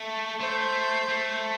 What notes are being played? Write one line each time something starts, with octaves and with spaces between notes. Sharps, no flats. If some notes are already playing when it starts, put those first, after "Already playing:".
Already playing: A3
A3 C5
A3